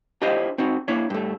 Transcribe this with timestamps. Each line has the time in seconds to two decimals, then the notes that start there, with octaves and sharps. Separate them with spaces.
0.22 D4 E4 F4 G4 C5 D#5
0.58 C4 D#4 F#4
0.88 A#3 D4 E4 C#5
1.10 G2 A3